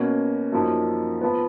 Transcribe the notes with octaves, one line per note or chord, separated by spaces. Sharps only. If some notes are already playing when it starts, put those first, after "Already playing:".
Already playing: B2 A#3 C#4
F#2 F3 A#3 D#4
F3 B3